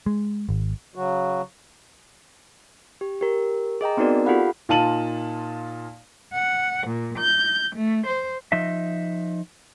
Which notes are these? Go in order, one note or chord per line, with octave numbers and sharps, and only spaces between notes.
G#3
G#1
C#3 F#3 F#4
G4
G4 A#4
G#4 D#5 G5 A#5
B3 C4 D#4 F#4 A#4 D5
F4 G4 A4 F5 F#5 B5
A#2 D#4 F4 A5 D#7 F#7
F#5
A#2
G6
A3
C5
F3 D#4 D#5 E5